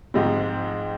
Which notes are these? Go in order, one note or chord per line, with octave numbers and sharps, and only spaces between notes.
G#2 F3 G#3 C4